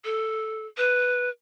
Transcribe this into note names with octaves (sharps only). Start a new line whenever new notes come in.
A4
B4